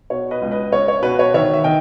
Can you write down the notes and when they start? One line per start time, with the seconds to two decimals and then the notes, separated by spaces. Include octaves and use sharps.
0.10 B2 C#5
0.31 B4 D#5
0.42 C#2
0.51 B4 D#5
0.72 C#2 C#5
0.88 C#5
1.02 B2 B4
1.19 C#5
1.34 D#3 C#5 E5
1.53 E5
1.64 D#3 D#5 G5